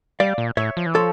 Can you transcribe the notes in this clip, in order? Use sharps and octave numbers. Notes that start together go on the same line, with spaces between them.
G3 D5 F5
A#2
A2 C#5 E5
F3
E3
F3 A4 C#5